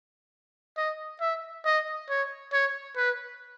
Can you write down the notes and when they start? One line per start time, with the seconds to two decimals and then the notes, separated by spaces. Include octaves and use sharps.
0.77 D#5
1.21 E5
1.65 D#5
2.09 C#5
2.53 C#5
2.97 B4